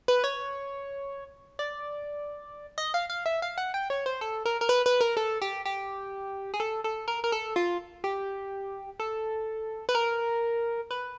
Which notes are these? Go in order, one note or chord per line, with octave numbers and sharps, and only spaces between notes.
B4
C#5
D5
D#5
F5
F5
E5
F5
F#5
G5
C#5
C5
A4
A#4
A#4
B4
B4
A#4
A4
G4
G4
G#4
A4
A4
A#4
A#4
A4
F4
G4
A4
B4
A#4
B4